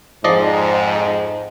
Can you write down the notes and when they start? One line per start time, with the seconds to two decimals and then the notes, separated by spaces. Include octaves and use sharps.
0.24 F2 G#2 F3 D5 D#5